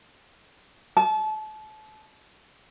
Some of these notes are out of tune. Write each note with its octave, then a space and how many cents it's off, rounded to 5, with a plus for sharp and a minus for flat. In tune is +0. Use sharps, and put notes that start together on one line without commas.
A5 -30